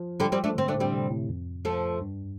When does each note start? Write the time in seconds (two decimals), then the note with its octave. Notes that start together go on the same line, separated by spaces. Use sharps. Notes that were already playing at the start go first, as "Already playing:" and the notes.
Already playing: F3
0.20 D3 G3
0.32 G3 C4
0.44 A3 D4
0.55 D3 C4
0.68 A3 D4
0.74 A2
0.80 G3 C4
0.93 C3
1.10 A2
1.29 F2
1.65 F3 A3
2.01 G2